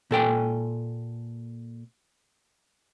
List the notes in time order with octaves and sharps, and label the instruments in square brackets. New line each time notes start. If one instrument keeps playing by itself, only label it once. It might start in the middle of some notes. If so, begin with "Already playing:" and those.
[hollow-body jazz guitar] A#2 A4 G5 G#5